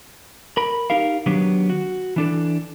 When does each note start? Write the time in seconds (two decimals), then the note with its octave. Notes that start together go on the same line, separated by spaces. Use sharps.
0.57 A#4 B5
0.90 D#4 G4 A#4 F5
1.26 D#3 F#3 B3 D4 G4
1.70 F#4
2.16 E3 D4 A4